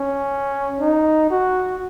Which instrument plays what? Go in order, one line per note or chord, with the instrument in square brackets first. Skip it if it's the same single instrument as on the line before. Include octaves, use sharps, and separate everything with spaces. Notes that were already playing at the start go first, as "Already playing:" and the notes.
Already playing: [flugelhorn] C#4
D#4
F#4